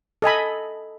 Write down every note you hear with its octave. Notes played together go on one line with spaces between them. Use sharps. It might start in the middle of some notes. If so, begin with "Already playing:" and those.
A4 D#5 G#5 B5